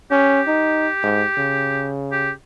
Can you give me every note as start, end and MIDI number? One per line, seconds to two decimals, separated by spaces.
0.11 0.41 61
0.11 1.90 67
0.47 0.88 63
1.03 1.25 44
1.38 2.33 49
2.12 2.31 67